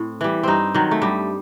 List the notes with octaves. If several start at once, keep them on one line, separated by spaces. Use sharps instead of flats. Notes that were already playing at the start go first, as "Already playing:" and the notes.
Already playing: A2 C4
E3 G3
G2 C4 D#4
D#3 F#3
A3
G2 G3